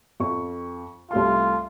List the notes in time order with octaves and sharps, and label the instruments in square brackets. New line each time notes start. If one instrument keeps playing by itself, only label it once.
[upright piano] F2 C#6
[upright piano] C2 A3 C6 [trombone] F4